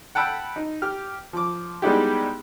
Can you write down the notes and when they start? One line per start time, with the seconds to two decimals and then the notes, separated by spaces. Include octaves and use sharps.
0.15 F#5 G5 A5 B5 E6
0.56 D#4
0.82 G4 F6
1.33 F3 D6
1.82 G3 G#3 B3 D#4 E4 G4